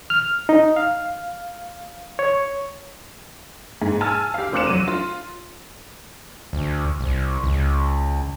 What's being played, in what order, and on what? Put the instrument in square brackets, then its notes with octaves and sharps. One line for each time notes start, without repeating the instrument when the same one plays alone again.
[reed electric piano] F6
D#4
F5
C#5
[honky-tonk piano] G#2
G#5 A5 E6 F6
G4 F5
F1 C4 D6 F#6 C#7 E7
F#3 D#7
F4
[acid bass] D2
C2
C#2